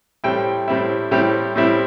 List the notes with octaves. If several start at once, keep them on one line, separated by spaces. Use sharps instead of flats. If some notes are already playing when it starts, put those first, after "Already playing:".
A2 G3 C4 E4 G5
A2 G3 C4 E4
A2 G3 C4 E4 G4
A2 G3 C4 E4